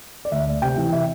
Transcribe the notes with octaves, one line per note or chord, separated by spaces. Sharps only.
D5
D2 E5
A3
C3 G5
E3
C3 E5